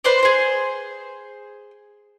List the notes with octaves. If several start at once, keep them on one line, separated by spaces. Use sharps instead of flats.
B4 C5 D5
G#4 C5